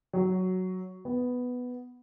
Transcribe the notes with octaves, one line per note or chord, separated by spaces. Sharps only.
F#3
B3